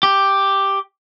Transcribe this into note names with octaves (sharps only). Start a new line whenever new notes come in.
G4